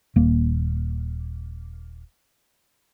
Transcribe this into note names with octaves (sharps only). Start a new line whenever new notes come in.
D#1 A#3